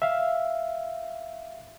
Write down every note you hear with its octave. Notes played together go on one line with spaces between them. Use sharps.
E5 F5